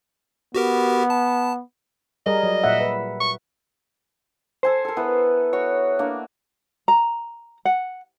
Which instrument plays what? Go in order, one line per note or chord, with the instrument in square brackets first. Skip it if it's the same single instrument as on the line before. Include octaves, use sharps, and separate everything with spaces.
[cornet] B3 [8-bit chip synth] F#4 G4 A#4
[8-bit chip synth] A5
[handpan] G3 G#4 A#4 [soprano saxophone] D#5
[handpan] F#3
A#2 E5 F#5
B4
[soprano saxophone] C#6
[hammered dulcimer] A4 G#5 A5 [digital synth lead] C5
[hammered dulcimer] A4 A#4
B3 E4 B4
[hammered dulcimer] F#4 [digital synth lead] C#5
[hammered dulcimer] A#3 D4
[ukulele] A#5
F#5